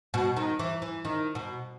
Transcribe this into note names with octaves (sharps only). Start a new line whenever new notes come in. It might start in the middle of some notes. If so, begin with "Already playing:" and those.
B2
D#3
E3
E3
D#3
B2